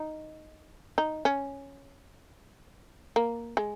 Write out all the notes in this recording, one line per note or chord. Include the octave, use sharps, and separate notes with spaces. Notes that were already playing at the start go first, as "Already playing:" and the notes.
Already playing: D#4
D#4
C#4
A#3
G#3